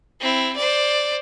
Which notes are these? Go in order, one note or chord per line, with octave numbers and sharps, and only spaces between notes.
C4 E4
C5 D5